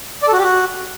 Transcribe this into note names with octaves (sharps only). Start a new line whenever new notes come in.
D5
A4
F#4
G4
F#4